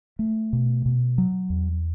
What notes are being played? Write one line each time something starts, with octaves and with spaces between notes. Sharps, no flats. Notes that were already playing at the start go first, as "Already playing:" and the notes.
A3
B2
B2
F#3
E2